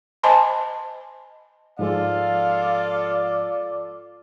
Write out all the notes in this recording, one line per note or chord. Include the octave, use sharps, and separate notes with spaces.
C5 D#5 G#5 A5 B5 C6
G#2 F3 G#3 F4 A4 D5 F5